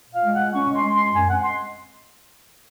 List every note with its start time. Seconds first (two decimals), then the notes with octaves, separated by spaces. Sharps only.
0.09 A#2 F5
0.23 G#3
0.33 A#2 F#5
0.53 C#4 C#6
0.68 G#3 C6
0.83 G#3
0.94 A#2 C6
1.13 F#2 G#5
1.29 C4 F#5
1.43 G#3 C6